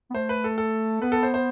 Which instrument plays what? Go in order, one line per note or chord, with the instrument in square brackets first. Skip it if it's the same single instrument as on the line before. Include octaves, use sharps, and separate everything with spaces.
[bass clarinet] B3
[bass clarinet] A3 [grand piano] C5
[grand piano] B4
A4
A4
[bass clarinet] B3 [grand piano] B4
[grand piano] A4
C5
C5